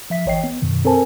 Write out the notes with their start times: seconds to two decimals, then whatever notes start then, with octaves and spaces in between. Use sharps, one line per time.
0.10 F3 E5 B6
0.26 A1 E3 C#5 D#5 G5 C7
0.44 B3
0.62 F#2 B2 D#3
0.85 C4 A4 A#4 C5 G#5 A5